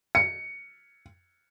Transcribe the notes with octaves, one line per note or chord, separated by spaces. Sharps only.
C#7